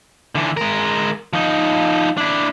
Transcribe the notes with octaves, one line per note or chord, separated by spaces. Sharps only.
D3 E3
G#3 A#4
F3 D#4
D4 E4